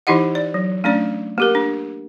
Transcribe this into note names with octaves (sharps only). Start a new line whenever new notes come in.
E3 D#4 E4 G4 D#5 F#5
D5
F#3
A3 C#4 D4 D5
A#3 G4 A#4
D4